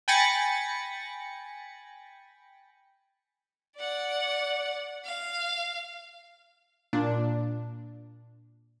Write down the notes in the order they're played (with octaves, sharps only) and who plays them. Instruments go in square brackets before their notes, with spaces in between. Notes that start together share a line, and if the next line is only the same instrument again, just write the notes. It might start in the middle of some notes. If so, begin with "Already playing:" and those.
[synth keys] G5 G#5 B5 A6 A#6 C#7
[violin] D5 F#5
F5
[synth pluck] A#2 D4